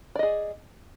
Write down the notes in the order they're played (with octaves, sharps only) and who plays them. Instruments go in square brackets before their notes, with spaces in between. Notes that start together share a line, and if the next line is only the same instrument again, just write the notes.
[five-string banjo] D5
D#5
G#4